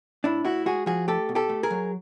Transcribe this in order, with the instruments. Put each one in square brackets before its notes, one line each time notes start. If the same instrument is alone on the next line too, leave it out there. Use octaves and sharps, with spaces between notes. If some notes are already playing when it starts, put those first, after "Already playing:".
[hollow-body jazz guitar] A2 D4 E4
A2 E4 F#4
G#3 F#4 G#4
F3 F#4 G#4
A3 G4 A4
B2
G4 A4
A3
G#4 A#4
F#3